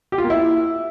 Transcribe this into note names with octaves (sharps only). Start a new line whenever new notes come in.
G4
F4
A#3
E4